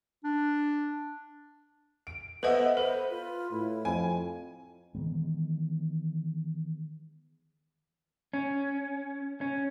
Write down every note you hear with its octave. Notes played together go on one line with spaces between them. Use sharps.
D4
D7
B3 A4 B4 C5 D#5 E5 F#5
A4 B4 C5
F4
A2 E4
F2 G#5
D#3 E3 G#3 B3
C#4
C#4